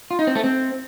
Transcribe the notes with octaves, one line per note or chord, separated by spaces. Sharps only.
F4
D#4
C4
A3
C4